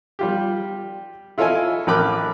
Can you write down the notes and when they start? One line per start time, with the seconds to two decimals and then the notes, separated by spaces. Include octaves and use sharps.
0.19 G3 F4 G4
1.38 E4 F4 A4 C#5 D#5 G#5
1.87 A1 A#4 G5 B5 D6 F#6